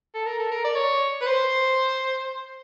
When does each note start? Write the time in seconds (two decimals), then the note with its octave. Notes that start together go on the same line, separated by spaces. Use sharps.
0.14 A4
0.26 A#4
0.39 A4
0.51 A#4
0.64 D5
0.76 C#5
1.21 B4
1.27 C5